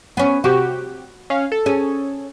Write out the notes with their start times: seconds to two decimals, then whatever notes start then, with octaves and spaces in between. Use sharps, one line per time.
0.17 B3 C#4
0.44 C3 F#4 G4
1.30 C#4 F5
1.52 A4
1.66 C#4 G#4